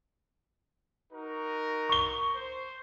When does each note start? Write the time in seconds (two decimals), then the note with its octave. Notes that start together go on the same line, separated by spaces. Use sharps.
1.12 D#4 F#4 A#4
1.89 C#6 G7
2.36 C5